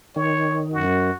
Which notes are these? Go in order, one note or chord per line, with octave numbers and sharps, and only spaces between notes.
D#3 C#5
F#2 F#4